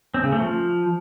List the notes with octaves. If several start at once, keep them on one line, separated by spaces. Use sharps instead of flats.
C4
C#3
A3
F3